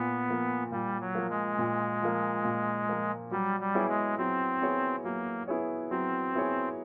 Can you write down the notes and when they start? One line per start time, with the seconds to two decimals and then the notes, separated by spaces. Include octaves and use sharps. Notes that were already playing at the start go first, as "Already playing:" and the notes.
Already playing: A#2 B3
0.28 F3 A#3
0.71 A#2 G3
1.01 F#3
1.15 F3 A#3
1.30 G#3
1.58 A#2
2.02 F3 A#3
2.44 A#2
2.89 F3 A#3
3.31 F#3 G3
3.60 G3
3.74 B3 E4 G#4 C#5
3.89 G#3
4.18 F#3 C4
4.61 B3 E4 G#4 C#5
5.04 F#3 A#3
5.48 B3 E4 G#4 C#5
5.91 F#3 C4
6.34 B3 E4 G#4 C#5